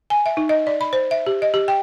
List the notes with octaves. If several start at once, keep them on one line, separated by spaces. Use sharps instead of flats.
G#5
E5
D#4
D#5
D5
B5
C5
E5
G4
D#5
G4
G5